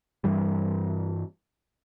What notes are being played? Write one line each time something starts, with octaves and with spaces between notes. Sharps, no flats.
G2 E3 G3